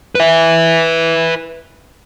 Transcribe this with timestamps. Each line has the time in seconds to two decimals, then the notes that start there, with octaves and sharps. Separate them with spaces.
0.15 B4 E5